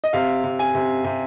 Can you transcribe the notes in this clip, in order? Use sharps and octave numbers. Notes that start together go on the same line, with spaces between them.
D#5
C3 F5
C3
G#5
C3
C3